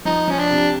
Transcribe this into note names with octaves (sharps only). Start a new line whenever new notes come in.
F3 D#4
F3 C#4
D4
C3